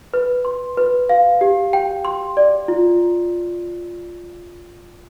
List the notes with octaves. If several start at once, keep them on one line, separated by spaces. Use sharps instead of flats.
B4
C6
B4
F5
G4
G5
C6
D5
F4